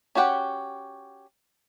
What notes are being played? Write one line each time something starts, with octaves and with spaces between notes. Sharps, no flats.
C#4 F#4 G4 F#5 G5